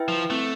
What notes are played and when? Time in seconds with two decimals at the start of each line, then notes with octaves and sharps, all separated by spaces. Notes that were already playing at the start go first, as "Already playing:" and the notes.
Already playing: E4 B4 E5 G5
0.08 F3
0.30 A3 C4